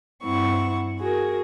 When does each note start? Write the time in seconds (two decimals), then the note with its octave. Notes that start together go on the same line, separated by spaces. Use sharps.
0.24 G2 C4 E4 F#5 C#6
0.98 F#4 G#4 A#4